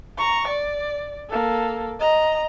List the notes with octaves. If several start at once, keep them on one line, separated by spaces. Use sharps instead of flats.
A#5 C#6
D5
A#3 A4
D#5 A#5